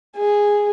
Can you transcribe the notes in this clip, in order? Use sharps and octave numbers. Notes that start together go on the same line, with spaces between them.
G#4